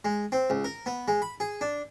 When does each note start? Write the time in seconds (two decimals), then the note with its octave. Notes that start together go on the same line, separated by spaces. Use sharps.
0.05 G#3
0.32 C4
0.50 C#2
0.64 A#4
0.86 B3
1.08 G#3
1.22 B5
1.40 G#4
1.61 D4